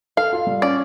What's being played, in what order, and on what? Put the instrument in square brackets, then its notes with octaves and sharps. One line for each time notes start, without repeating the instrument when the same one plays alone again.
[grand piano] A4 [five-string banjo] F5
[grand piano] F4
G3
[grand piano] C#4 [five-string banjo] D5